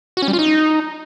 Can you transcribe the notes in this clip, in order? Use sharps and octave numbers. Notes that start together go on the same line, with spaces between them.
F#4
C#4
G3
F4
D#4